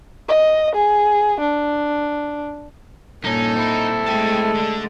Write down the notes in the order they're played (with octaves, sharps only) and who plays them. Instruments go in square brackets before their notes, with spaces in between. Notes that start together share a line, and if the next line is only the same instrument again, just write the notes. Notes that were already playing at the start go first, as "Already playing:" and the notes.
[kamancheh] D#5
G#4
D4
[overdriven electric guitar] G2 C#4 [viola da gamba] A#2 [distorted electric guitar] D#4 [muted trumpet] A4
[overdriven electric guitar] C4 E4
[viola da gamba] G#3 A3 [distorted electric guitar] G5 A5
[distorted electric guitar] D3